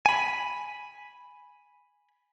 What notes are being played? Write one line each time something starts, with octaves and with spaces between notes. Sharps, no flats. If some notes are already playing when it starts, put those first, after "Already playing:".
G#5 B5